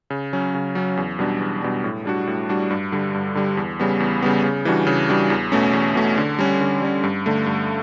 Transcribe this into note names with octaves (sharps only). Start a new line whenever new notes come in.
C#3
F#3 C#4
C#3
F#3 C#4
E2
B2 G3 D4
E2
B2 G3 D4
A2
G3 D4 F#4
A2
G3 D4 F#4
G2
D3 G3
G2
D3 G3
E2
C#3 G3 B3
E2
C#3 G3 B3
C#3
E3 G3 D4 F#4
C#3
E3 G3 D4 F#4
E2
B2 A3 C#4
E2
B2 A3 C#4
D3
G3 C#4
D3
G3 C#4
G2
D3 A3
G2